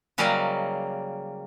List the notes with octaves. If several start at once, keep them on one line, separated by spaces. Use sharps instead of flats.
C#3 F#3 G3 A#3 D5 D#5